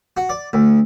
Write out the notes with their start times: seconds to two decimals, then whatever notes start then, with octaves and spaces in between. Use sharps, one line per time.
0.17 F#4
0.29 D5
0.53 D2